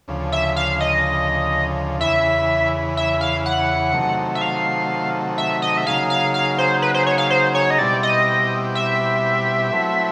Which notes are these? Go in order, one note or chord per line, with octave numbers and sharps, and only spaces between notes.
D2 C#3 F3
E5
F5
D#5
E2 C#3 E3 E5
E5
F5
F#5
C3 D#3 F#3 A3
E5
F5
E5
D#5
E5
C#3 F#3 A#3 D#4 G#4 F5
F5
F5
C5
B4
C5
C#5
F5
C5
C#5
D#5
B2 G3 C4 E4 G4 D5
D#5
E5
F#3 A3 C4 E4